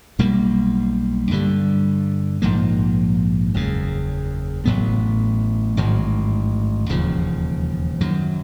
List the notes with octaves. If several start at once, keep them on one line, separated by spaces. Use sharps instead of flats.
B1 B2 G3 A#3
G2 D3 G3
A#1 G#2 F3 A#3
F#1 E2 C#3
A1 A2 F#3 B3
A1 G#2 D#3 F#3
E1 D#2 C#3 F3
F#2 D#3 F#3